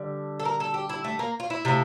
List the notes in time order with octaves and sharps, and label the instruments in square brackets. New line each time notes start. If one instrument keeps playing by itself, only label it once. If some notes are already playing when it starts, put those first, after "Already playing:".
Already playing: [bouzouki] D3 G3
A4
A#4
A4
G4
E4
A3
A#3
F4
E4
C3 F3 A3